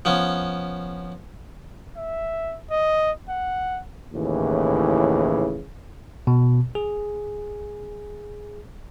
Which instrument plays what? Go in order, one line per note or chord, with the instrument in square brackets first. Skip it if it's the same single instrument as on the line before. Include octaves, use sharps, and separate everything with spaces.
[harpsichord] F3 B3 C#4
[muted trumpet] E5
D#5
F#5
[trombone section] D#2 A2 C#3 E3
[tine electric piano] B2
G#4